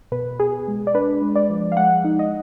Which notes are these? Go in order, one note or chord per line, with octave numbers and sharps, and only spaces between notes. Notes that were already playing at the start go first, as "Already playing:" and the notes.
B2 B4
B2 G#4
G#3
D5
D4 B4
G#3
D5
F3
F5
G#3 F#5
D#4
D#5